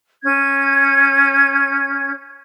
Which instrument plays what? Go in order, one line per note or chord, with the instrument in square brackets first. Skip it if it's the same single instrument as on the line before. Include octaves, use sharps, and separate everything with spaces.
[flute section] C#4 G#6